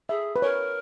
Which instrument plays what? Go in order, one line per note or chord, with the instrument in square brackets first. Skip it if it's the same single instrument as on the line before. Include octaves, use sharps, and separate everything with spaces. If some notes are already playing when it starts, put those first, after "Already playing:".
[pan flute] G#4 [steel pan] E5
[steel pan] B4
[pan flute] A#4 [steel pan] C#5